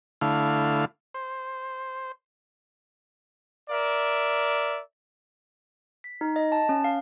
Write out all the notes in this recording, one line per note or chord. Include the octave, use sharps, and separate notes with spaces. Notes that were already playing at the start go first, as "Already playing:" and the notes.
D3 A3 E4 F5
C5
A#4 D5 E5
B6
D#4
D#5
A5
C#4
F5